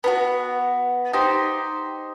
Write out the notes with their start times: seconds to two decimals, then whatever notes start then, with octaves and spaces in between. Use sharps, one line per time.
0.04 B3 D4 F#4
1.13 D#4 G4 C5